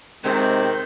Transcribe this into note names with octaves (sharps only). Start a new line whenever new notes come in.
C3 D#3 G#3 C4 C5